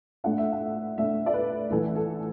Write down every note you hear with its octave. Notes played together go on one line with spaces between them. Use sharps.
A2 A3 D4 F#5
E5
F#5
A2 A3 D4 E5
D5
B4
A1 A2 E3 A4
A4